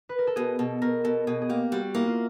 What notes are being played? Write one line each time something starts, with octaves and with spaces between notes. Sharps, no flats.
B4
A#4
A4
B2 G#4
B2 A4
B2 A#4
B2 A4
B2 G#4
G#4
A#3 G4
G3 F#4
A#3 E4
F4